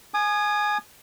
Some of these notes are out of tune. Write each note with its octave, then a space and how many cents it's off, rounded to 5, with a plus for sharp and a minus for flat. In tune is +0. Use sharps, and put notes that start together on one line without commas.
G#5 +10 D#6 -30